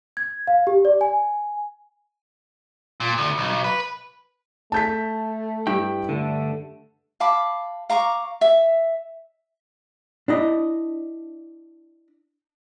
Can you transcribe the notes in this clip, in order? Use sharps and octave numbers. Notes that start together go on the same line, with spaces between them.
G#6
F5
G4
D5
G#5
A#2
D2
B1
B4
A3 A5 G6 B6
G2 E4 G5
D3 A3
F5 A5 B5 D6
F5 A#5 C#6 D6
E5
D4 E4 D#5